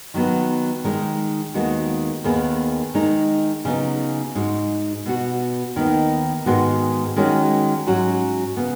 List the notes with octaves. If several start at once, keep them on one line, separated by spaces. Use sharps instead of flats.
D#3 F#3 B3
D#3 G#3 D#4
D#2 D#3 G#3 B3 F#4
D#2 D#3 B3 G#4
D#3 G#3 D#4
C#3 F#3 B3 D#4
G#2 G#3 D#4 F#4
B2 B3 F#4
D#2 D#3 B3 D#4
G#2 D#3 G#3 B3 F#4
D#3 G#3 C#4 F#4
G#2 F#3 C#4 F#4
C#3 B3